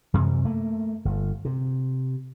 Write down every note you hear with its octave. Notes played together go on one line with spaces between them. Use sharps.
F#2 C3 E3 G#3
A3 A#3
G1
C3